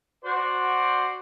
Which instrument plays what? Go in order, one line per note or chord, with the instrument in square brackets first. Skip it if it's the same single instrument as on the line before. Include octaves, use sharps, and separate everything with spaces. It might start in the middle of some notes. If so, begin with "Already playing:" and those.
[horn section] F#4 C5 D5